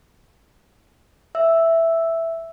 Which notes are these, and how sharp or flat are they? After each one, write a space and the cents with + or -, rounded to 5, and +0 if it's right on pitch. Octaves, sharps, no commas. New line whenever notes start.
E5 +0 E6 +0